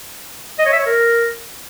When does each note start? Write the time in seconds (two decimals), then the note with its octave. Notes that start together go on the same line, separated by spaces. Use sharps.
0.59 D#5
0.65 C#5
0.72 E5
0.79 C#5
0.86 A#4